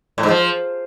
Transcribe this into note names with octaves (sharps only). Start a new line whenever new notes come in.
A2
G#2
F3